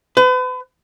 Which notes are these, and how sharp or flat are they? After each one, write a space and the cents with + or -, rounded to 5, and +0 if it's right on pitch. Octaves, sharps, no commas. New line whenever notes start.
B4 +40